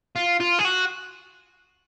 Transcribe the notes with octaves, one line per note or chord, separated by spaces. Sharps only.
F4
F4
G#4
F#4